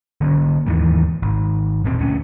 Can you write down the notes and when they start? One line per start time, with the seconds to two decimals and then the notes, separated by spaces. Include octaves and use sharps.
0.21 D3 A#3 C#4
0.67 D#2 G#2 E3
1.22 G#1
1.84 E1 A#2 C4
1.99 D2 C#4